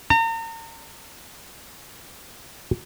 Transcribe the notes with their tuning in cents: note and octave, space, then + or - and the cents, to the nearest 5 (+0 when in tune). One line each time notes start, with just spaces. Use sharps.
A#5 -40